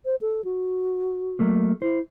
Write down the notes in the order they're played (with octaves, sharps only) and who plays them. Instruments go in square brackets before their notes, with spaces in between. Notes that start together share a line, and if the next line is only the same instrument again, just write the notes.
[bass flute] C5
A4
F#4
[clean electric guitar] F#3 A3 A#3
[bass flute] E4 [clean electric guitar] C5